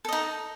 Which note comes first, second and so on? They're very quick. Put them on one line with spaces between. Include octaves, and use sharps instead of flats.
A4 D#5 D#4